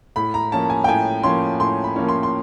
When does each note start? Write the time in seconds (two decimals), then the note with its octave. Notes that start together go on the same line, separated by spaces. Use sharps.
0.16 A2 B5
0.34 A#5
0.52 F3 A#3 C#4 A5
0.70 G#5
0.84 G5
0.88 A2 G#5
1.23 F3 A#3 C#4 C6
1.60 A2 C6
1.84 B5
1.96 F3 A#3 C#4
2.08 C6
2.23 C6